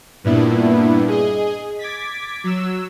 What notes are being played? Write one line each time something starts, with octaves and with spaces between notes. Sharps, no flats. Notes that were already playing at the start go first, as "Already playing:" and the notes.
G2 A#2 B3 D4 E4
G#4 D#5
D6 G#6 A6 B6
F#3 E6